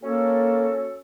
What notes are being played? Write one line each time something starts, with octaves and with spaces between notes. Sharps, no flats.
A#3 C#4 F#4 A4